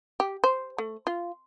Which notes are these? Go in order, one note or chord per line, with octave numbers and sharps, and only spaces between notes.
G4
C5
A3
F4